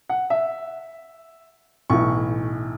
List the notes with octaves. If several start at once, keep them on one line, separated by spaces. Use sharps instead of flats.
F#5
E5
B1 A2 E3 C#6